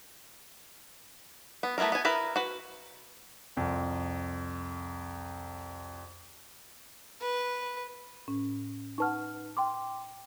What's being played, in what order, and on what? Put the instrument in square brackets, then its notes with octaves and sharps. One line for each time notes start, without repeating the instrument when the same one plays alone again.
[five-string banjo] B3
A3 B3 E4 F4 A#4
B3 G#5
E4 A#4 B4
F#4 B4
[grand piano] C2 F2
[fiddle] B4
[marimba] A2 C#4
[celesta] D#4 B4 F6 [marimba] F#5 A5 C#6
[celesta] G5 C6 D6